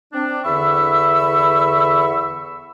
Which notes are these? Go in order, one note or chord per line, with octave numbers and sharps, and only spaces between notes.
C4 D4
E2 D3 E5 B5 C#6 E6